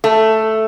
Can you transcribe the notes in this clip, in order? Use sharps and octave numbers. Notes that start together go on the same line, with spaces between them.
A3